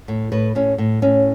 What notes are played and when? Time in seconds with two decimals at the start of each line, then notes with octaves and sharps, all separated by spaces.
0.08 A2
0.32 A2 B4
0.55 A2 C#4
0.78 A2
1.02 A2 C#4